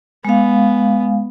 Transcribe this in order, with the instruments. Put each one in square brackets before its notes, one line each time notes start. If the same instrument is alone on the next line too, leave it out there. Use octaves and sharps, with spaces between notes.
[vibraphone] G#3 F5 [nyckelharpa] B3